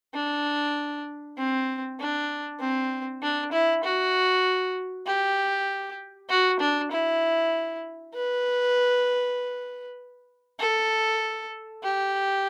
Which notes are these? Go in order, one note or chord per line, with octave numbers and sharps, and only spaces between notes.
D4
C4
D4
C4
D4
E4
F#4
G4
F#4
D4
E4
B4
A4
G4